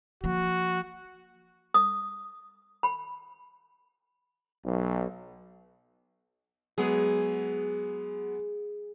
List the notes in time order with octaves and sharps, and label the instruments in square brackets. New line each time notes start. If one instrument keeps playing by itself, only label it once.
[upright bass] F3 A#3 [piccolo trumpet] F#4
[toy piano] D#6
B5
[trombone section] B1
[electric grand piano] F#3 G#3 B3 [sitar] G#4